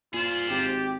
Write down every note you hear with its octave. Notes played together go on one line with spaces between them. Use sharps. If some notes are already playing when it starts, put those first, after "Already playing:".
A#2 F4 G#4 C5
G#1 G4